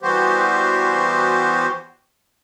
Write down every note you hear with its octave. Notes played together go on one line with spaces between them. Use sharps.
E3 G3 B3 F#4 G4 C5